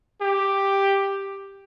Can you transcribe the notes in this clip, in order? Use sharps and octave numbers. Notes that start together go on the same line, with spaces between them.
G4